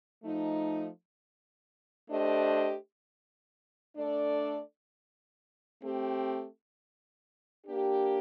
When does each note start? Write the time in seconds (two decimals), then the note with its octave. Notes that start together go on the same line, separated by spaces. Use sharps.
0.23 F3 A3 D#4
2.09 A3 D4 G4 C5 D#5
3.94 A3 D4 A4 D5
5.80 A3 C4 G4
7.66 A#3 D4 G4